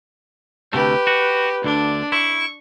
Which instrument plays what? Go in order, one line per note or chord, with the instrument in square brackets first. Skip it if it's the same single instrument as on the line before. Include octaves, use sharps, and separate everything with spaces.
[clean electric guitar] D2 C3 A3 [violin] G4 B4
[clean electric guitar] F#4
[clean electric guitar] D2 D3 [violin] D4
[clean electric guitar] E4 [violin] C#6